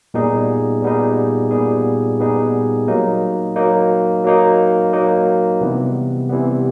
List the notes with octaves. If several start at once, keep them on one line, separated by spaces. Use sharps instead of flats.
A#2 G3 B3 D#4 G#4
A#2 G3 B3 D#4 G#4
A#2 G3 B3 D#4 G#4
A#2 G3 B3 D#4 G#4
F#3 A#3 D#4
F#3 A#3 D#4
F#3 A#3 D#4
F#3 A#3 D#4
C3 E3 G3 B3
C3 E3 G3 B3